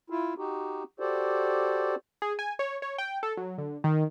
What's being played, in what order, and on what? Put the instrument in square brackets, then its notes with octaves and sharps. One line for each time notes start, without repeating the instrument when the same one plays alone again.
[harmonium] E4 F4
D#4 F#4 G4
F#4 G4 A4 C5 D5
[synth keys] G#4
G#5
C#5
C#5
G5
A4
F#3
D3
D#3